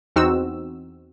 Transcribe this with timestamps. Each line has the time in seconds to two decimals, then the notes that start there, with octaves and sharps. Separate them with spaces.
0.16 E2 C4 D#4 F#4 E6